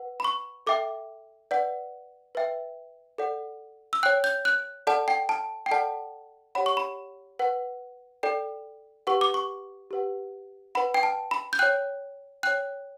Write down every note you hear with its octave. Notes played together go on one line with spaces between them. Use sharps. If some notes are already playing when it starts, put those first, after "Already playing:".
Already playing: B4 F#5
B5
C#6
A4 E5 G5 D6
B4 D5 F#5
B4 E5 G5
A4 D5 F#5
E6
C#5 G5 F#6
G6
F#6
A4 D5 F#5 A5
G5
A5
G5
A4 D5 F#5 A5
G4 C#5 F#5 B5
C#6
B5
B4 F#5
A4 D5 G5
G4 B4 F#5 C#6
D6
C#6
G4 B4 F#5
B4 F#5 B5
G5
A5
B5
G6
C#5 G5 F#6
C#5 G5 F#6